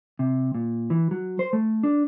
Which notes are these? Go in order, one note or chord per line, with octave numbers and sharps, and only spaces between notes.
C3
A#2
E3
F#3
C5
A3
D4